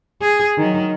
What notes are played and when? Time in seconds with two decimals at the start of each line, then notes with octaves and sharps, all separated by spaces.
0.22 G#4
0.58 D#3 F#3